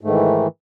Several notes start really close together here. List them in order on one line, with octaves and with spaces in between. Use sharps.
G#2 A3 D#3 E3